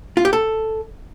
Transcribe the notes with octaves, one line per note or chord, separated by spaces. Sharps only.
F4
G4
A4